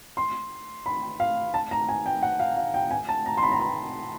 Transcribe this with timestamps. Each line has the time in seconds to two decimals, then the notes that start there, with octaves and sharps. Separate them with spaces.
0.17 C6
0.86 B5
1.20 F5
1.54 A5
1.71 A#5
1.89 G#5
2.06 G5
2.23 F#5
2.40 F5
2.57 F5
2.74 G5
2.91 G#5
3.09 A5
3.26 A#5
3.37 C6
3.43 B5
3.52 A#5
3.60 B5